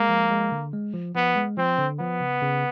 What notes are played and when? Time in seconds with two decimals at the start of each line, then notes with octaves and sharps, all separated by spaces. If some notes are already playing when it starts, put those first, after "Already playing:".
Already playing: G#3 A#3
0.09 F3
0.30 G#3
0.52 D3
0.73 G#3
0.94 F3
1.15 F3 B3
1.36 G#3
1.57 F3 C4
1.78 D3
2.00 F3 B3
2.20 C#3
2.42 C#3